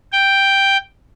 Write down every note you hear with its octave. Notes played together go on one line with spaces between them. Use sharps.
G5